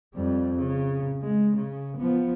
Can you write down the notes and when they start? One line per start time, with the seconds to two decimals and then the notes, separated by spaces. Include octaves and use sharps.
0.15 F2 G3
0.58 C#3
1.22 G#3
1.57 C#3
1.97 F3 B3